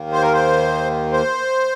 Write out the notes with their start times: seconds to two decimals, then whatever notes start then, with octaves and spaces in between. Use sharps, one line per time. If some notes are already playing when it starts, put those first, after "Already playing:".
Already playing: D#2 D#3 A#3
0.12 C5
0.22 A#4
0.33 C5
1.12 C5